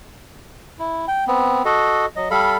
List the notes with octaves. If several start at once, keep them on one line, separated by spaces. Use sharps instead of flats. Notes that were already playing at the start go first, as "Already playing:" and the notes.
E4
G5
B3 C4
F#4 A4 D#5
F#3 D#5
G3 A4 F5 B5